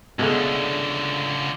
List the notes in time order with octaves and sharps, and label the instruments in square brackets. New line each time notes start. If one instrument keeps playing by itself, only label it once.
[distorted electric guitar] C#2 D3 [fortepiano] B2 G#3 A3